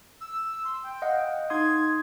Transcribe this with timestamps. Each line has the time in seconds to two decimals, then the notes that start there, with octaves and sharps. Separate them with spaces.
0.21 E6
0.64 C6
0.83 G5
1.02 D#5 F5 F#5
1.50 D#4 C6 D#6 G#6